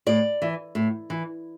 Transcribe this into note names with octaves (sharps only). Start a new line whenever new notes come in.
A2 D5
E3
A2
E3